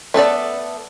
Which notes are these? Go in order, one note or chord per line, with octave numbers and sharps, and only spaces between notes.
A3 B3 A4 D5